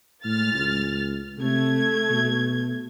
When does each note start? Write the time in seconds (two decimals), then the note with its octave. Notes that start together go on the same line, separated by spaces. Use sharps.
0.25 A2 G#3 F6 A6
0.54 C#2
1.39 C3 A3 G#6
2.10 B2